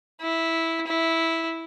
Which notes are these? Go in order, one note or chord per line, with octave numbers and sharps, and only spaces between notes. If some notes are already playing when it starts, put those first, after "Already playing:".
E4
E4